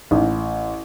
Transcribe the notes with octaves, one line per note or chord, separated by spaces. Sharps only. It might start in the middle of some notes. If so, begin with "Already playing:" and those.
A1